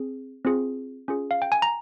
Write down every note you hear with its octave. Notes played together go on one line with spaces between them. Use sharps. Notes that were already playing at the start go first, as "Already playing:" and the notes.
Already playing: C4 G#4
C4 F4 G#4
C#4 F4 G#4
F5
G5
G#5
A#5